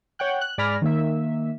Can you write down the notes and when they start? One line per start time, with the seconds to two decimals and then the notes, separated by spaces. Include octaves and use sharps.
0.19 C#5 F#5 G5 F#6
0.41 F#6
0.58 G#2 D5 G#5 B5 F6 A#6
0.82 D#3 A#3 E5